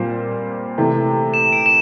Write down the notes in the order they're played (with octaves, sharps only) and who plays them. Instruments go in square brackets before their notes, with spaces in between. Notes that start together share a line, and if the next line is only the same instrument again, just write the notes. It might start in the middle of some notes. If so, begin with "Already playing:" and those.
Already playing: [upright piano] A#2 G3 C4 F4 C5
C3 E3 A3
[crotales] E7
D7
E7